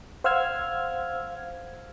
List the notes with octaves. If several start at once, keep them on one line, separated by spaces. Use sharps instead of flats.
C5 F5 F#5 E6 F6 G#6